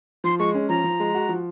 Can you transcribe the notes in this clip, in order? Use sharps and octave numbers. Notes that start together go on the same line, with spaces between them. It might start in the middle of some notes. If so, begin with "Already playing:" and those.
F3 C6
G#3 C#6
C#4
F3 A#5
F3
G#3
F#4
F3